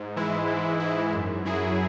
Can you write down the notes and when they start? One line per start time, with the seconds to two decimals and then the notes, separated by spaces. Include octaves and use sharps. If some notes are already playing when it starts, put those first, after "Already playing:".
Already playing: G#2
0.16 E3 G#3 E4
0.48 G#2
0.80 E3 G#3 E4
1.13 F#2
1.45 F#3 E4 G#4